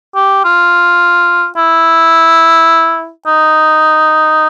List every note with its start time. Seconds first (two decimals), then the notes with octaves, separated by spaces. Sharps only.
0.15 G4
0.44 F4
1.57 E4
3.27 D#4